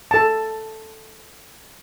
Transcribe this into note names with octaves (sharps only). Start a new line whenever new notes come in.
A4 A5